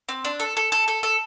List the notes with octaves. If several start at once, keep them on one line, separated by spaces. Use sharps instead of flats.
C4
D4
A4
A4
A4
A4
A4